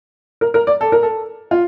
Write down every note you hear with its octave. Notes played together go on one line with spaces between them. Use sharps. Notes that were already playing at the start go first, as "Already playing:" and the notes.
A#4
A#4
D5
A4
A#4
A4
F4